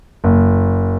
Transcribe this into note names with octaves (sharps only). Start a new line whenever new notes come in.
F#1